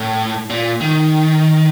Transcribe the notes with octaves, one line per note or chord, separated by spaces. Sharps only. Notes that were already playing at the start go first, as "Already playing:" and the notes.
Already playing: A2
A#2
D#3